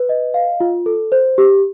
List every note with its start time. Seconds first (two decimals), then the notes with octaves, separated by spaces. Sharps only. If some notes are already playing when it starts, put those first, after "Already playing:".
Already playing: B4
0.09 D#5
0.34 F5
0.60 F4
0.86 A4
1.12 C5
1.38 G4